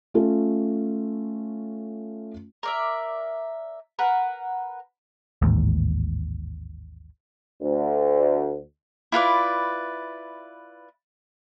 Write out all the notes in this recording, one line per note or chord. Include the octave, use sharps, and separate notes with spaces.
A3 C#4 F4 A4
A#4 D5 E5
A#4 B4 F#5
A1 D#2 G#2
D2
E4 F4 B4 D5